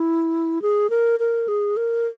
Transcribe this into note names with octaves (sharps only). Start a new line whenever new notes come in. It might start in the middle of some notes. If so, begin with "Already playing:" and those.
Already playing: E4
G#4
A#4
A#4
G#4
A#4